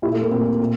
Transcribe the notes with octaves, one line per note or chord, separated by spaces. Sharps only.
A#2 E4 G4
A3
A#3
A#2 A3 C4
A#2